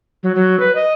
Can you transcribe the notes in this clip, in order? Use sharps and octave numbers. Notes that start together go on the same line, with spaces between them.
F#3
F#3
B4
D#5